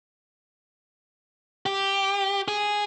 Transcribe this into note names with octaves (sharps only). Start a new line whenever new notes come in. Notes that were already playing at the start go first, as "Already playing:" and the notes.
G4
G#4